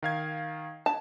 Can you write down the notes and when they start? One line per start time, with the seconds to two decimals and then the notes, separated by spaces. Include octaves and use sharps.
0.03 D#3 F5 G#6
0.86 A5